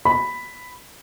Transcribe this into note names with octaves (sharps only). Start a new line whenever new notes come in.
B5